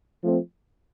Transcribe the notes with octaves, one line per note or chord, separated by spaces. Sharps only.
F3 A3 C4